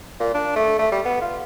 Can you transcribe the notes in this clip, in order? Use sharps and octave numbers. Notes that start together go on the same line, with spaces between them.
A#2
D4
A3
A3
G3
B3
F4